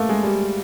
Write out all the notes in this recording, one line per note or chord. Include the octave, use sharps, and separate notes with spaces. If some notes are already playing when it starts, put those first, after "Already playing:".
Already playing: A3 A#3
G#3
G3